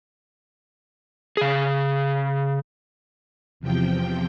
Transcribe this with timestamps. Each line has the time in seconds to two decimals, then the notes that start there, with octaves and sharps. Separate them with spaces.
1.37 C#3 G#4
3.60 E2 C3 F3 G5